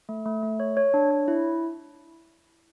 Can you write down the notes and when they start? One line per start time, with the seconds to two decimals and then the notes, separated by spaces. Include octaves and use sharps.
0.09 A3
0.26 A3
0.43 A3
0.60 C#5
0.77 C#5
0.94 D4
1.11 C#5
1.28 E4